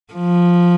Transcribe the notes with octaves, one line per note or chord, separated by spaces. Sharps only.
F3